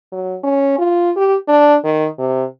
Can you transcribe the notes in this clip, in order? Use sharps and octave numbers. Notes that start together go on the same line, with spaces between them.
F#3
C#4
F4
G4
D4
D#3
C3